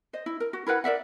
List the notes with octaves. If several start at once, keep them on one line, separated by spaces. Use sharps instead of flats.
C5 D#5
E4
A#4
F#4
E4 A#4 B4 F#5
A#4 D5 E5 F#5